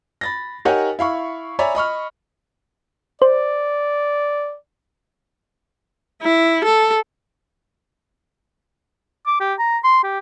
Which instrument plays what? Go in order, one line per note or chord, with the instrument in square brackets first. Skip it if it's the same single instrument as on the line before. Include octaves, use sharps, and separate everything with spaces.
[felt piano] B5 A6 A#6
D#4 G4 A#4 C#5 F#5 G#5
E4 F5 B5 C#6
C#5 D5 E5 G#5 A#5 B5
D#5 B5 C#6 F6
[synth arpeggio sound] C5 [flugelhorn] D5
[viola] E4
A4
[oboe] D6
G4
A#5
C6
G4